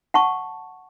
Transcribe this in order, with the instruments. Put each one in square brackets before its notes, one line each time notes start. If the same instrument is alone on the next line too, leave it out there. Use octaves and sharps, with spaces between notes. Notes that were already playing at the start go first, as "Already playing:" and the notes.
[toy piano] F#5 A5 C#6